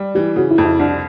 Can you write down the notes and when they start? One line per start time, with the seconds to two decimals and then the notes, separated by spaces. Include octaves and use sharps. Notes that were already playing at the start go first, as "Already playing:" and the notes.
Already playing: G3
0.15 E3 G4
0.36 C#3 F#4
0.50 E4
0.58 F2
0.65 E4
0.79 C2 D4